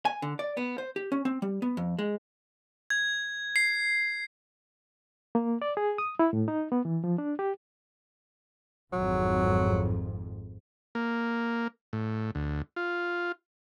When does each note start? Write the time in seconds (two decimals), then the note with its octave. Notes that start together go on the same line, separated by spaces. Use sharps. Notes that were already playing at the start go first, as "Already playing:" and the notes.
0.05 G#5
0.22 D3
0.39 D5
0.57 B3
0.78 C5
0.96 G4
1.12 C#4
1.25 C4
1.42 G3
1.62 B3
1.77 F2
1.99 G#3
2.90 G#6
3.56 C7
5.35 A#3
5.62 D5
5.77 G#4
5.98 D#6
6.19 E4
6.33 A2
6.48 D#4
6.72 B3
6.85 E3
7.04 F3
7.18 D4
7.39 G4
8.93 G#1 F2 G#2 F#3
10.95 A#3
11.93 A2
12.35 D2
12.76 F4